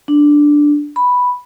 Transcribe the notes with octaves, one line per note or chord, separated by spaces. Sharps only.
D4
B5